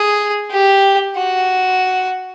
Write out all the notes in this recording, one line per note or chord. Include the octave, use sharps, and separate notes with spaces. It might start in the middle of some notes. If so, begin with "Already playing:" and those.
Already playing: G#4
G4
F#4